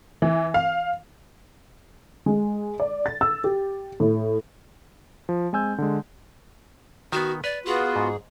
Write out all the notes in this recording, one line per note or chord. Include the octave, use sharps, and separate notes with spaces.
E3
F5
G#3
D5
A6
E6
G4
A2
F3
G#3 C4 G#5 E6 G6
D3 G#3
D#3 B3 F#4
B4 D5
B3 F4 F#4 G#4
G#2